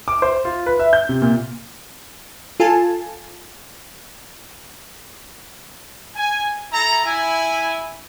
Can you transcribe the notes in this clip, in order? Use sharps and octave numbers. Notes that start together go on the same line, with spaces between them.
D6
C5
F4
B4
E5
G6
C3
A#2
F4 A4 G#5 A5
G#5
E4 A4 A#5
E4 G#5